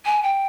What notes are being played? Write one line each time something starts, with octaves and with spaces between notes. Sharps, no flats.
G#5
G5